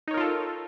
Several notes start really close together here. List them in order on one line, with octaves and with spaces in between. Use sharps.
D#4 C#5 A#4 F4 A4